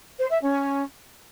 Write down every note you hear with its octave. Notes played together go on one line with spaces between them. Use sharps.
C5
E5
C#4